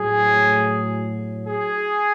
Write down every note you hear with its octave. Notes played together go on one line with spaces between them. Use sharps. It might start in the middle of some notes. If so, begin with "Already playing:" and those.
Already playing: A2 F#3 G#4
G#4